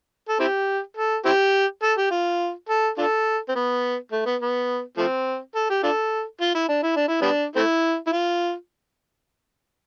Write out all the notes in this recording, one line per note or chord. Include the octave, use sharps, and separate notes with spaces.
A4
C4 E4 G4
A4
C4 E4 G4
A4
G4
F4
A4
D4 F4 A4
C4
B3
A3
B3
B3
F3 A3 C4
A4
G4
D4 F4 A4
F4
E4
D4
E4
D4
E4
G3 B3 D4
A3 C4 E4
E4
F4